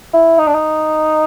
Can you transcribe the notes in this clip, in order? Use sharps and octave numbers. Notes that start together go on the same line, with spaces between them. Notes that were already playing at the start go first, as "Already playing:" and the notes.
E4
D#4
D4
D#4